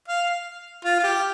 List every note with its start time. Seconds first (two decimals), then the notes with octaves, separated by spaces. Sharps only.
0.08 F5
0.85 F4
0.99 F4
1.04 G4